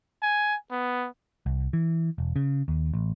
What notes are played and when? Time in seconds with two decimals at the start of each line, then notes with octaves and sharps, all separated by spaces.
0.23 G#5
0.71 B3
1.46 C2
1.73 E3
2.18 E1
2.36 C#3
2.68 D#2
2.94 A1